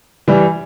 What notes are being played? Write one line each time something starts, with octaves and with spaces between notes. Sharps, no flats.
E3 G3